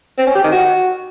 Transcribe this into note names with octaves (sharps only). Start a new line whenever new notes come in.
C4
C#4
G4
D#3
F#4